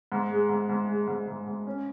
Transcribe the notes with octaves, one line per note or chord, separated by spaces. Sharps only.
G#2
G#3
G#2
G#2
G#3
G#2
G#2
G#2
C#4